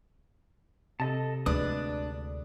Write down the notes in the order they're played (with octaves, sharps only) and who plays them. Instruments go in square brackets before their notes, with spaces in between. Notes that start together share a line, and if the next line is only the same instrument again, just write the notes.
[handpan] C3 [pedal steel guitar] A4 D#5 A5
[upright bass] D2 [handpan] G#3 B4 [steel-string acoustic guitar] D4 [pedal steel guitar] D5 D#6